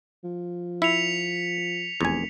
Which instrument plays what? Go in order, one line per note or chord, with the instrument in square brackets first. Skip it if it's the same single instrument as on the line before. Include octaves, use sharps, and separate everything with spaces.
[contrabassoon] F3
[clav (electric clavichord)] E4 [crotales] B6 C#7 F7
[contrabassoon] F1 [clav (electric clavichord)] E2 G#5